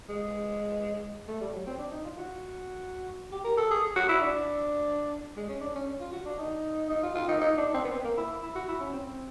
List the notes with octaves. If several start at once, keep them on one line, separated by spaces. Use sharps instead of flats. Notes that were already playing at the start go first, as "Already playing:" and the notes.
G#3
A3
G3
F#3
C4
D4
D#4
F4
F#4
G4
A#4
A4
G#4
F#4
E4
D4
G#3
C#4
D4
C#4
F4
F#4
D4
D#4
D#4
F4
F4
D#4
D#4
D4
C4
B3
C4
A#3
E4
E4
F#4
E4
C#4
C4